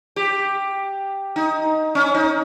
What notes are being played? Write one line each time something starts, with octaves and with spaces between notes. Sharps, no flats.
G4
D#4
C#4
D#4